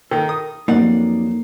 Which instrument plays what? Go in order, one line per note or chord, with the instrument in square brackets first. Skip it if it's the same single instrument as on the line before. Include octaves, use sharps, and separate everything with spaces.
[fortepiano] D#3 [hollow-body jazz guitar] A4 A#4
[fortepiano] D#6
[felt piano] F2 F#3 C7 [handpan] A#3 [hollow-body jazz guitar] D#4 D5 F#5